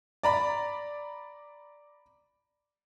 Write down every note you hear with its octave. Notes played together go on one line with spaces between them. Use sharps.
D5 A#5 B5